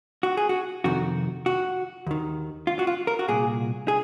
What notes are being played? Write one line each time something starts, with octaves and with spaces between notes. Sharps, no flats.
F#4
G#4
F#4
F2 C3 D#3 F#4
F#4
D#2 D#3
F4
F#4
F4
A#4
F#4
C2 A#2 G#4
G#4